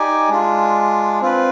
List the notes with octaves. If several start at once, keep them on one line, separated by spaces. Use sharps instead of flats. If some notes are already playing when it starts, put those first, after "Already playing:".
Already playing: D#4 G4 D5 G#5
G#3 D4 F4
C4 F4 B4